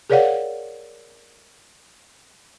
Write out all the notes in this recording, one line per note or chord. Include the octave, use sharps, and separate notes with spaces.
G#4 A#4 C#5 D5 F5 F#5